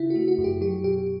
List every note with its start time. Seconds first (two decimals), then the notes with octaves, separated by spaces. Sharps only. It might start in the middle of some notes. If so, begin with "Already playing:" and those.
Already playing: C#3 E4
0.10 F#4
0.15 A3
0.28 F#4
0.38 F#2
0.44 G4
0.61 F#3 G4
0.84 B2 G4